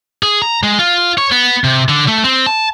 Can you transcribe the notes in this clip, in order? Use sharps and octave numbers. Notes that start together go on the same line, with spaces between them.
G#4
A#5
G#3
F4
C#5
B3
C3
D3
A3
C4
A5